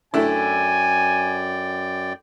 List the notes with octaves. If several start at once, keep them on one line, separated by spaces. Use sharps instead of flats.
F#2 A3 D4 E4 D5 G5 G#5